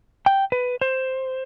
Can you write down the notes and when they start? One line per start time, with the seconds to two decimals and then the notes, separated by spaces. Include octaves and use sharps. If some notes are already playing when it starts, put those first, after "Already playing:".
0.26 G5
0.52 B4
0.81 C5